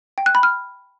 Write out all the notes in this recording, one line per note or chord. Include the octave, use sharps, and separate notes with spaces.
G5
F#6
B5
F6